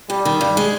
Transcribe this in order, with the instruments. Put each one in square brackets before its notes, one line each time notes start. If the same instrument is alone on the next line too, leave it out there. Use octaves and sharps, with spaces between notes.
[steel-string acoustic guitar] G2 [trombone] G3
[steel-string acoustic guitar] D#3
G2
G#3